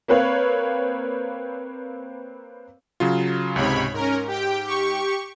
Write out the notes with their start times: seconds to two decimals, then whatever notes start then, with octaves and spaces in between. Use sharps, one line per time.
0.08 A#3 C4 B4 C#5 F5
3.00 C#3 F#3 F4
3.56 C#2 G#2 C3 C#5 B5
3.94 G#2 C#4 A#4
4.27 G4 G5
4.64 G4 C#6